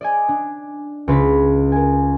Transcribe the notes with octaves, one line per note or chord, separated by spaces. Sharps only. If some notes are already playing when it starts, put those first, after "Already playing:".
D5 D#5 G#5
D4
C#2 B4 A#6 B6
A#4 G#5